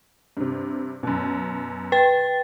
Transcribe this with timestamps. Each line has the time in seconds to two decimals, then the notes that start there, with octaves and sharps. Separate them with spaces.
0.37 G2 C3
1.03 F#2 B2
1.92 B4 G5 A6